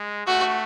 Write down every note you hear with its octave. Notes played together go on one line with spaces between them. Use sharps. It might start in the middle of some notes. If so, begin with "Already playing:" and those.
Already playing: G#3
A3 F#4